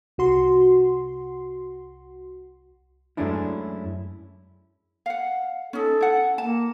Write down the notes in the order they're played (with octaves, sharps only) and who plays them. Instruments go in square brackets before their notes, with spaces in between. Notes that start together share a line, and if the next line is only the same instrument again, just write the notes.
[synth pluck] C2 F#4 C6
[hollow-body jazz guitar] F#2 G#3 A3 C#4 D4 E4
[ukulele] F5 F#5
[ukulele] C#4 D#4 [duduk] A4
[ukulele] E4 F#5
[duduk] A#3 [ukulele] A5